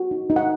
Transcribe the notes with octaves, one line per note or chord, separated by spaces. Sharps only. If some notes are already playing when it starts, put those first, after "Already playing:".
Already playing: F#4
D#4
D#4
F#5